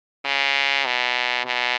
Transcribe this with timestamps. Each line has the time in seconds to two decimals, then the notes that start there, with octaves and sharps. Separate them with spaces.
0.25 C#3
0.85 B2
1.46 B2